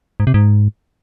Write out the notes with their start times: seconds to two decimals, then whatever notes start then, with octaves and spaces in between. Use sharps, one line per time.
0.20 G#2
0.27 C3
0.34 G#2